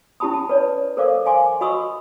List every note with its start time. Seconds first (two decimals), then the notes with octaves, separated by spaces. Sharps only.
0.20 C#4 E4 G4 A5 B5 D#6
0.34 A5
0.49 B4 C#5 D5
0.97 A4 A#4 C5 D5 F5 D6
1.26 F5 G#5 C6 D6
1.61 F#4 D#5 B5 C#6 D#6 E6